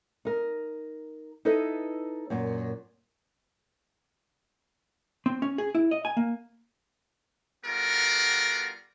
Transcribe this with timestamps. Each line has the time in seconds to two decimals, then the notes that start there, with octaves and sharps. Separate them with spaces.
0.25 D#4 A#4
1.45 D#4 E4 A4 B4 D#5
2.30 F#2 A#2
5.26 C4
5.42 C#4
5.58 G#4
5.75 E4
5.91 D#5
6.05 G#5
6.17 A#3
7.65 G3 B3 F4 F#4 A4 A#4